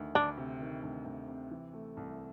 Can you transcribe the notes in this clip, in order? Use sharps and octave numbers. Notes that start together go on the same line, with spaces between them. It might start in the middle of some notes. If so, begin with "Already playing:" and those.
Already playing: D2 D#3
D2 D4
C3
D#3
D2
D2
C3
E3
A3
C2